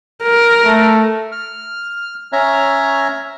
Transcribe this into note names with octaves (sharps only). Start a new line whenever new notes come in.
A#4
A3
F6
C#4 C#5 E5 A#5 F6